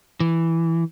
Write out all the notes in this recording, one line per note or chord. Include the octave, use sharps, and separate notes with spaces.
E3